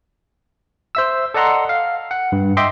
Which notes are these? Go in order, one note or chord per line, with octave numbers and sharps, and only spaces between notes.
C5 E5 E6
A4 D5 D#5 F#5 A#5 C6
F5
F#5
G2
D#5 E5 G5 C6 D6